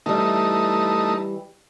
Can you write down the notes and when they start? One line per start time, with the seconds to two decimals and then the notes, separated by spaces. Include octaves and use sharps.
0.06 E3 G3 A3 D#4